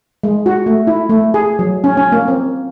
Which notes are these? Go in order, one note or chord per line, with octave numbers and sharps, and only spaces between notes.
G#3
F#4
A3
E4
A3
G#4
F#3
C#4
C#4
A#3
C4